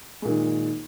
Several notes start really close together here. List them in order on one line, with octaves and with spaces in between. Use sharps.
G#3 A#2 D#3